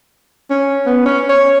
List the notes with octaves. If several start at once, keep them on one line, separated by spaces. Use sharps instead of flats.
C#4
B3
C#4
C#5